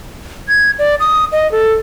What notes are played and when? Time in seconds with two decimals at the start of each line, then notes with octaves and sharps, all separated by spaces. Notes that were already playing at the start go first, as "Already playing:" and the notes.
0.48 G#6
0.79 D5
1.00 D#6
1.32 D#5
1.52 A4